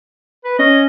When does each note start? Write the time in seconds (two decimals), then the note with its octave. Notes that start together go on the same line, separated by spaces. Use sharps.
0.45 B4
0.59 C#4 D#5